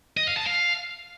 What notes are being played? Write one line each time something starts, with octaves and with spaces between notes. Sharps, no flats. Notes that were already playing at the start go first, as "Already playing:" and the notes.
D#5
F5
A5
F5